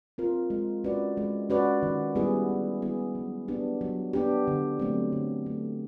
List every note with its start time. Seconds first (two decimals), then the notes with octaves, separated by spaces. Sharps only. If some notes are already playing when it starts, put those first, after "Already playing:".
0.18 C4 F4 A#4
0.50 G#3
0.84 C#4 F#4 B4 D5
1.17 G#3
1.50 C#4 F#4 B4 D5
1.83 D#3
2.15 G3 B3 E4 G#4
2.49 D#3
2.82 G3 B3 E4 G#4
3.15 F#3
3.48 B3 D4 G4
3.81 F#3
4.13 B3 D4 G4
4.47 D3
4.79 F#3 A3 C4
5.12 D3
5.46 F#3 A3 C4